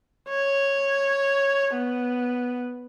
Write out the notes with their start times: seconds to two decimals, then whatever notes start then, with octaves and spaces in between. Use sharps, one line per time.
0.29 C#5
1.74 B3